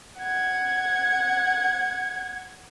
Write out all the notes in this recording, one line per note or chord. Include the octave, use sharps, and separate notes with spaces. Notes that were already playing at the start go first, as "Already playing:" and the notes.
F#5 G#6